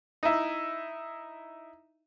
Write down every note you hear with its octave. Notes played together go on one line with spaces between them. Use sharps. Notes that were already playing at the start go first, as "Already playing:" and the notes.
D#4 E4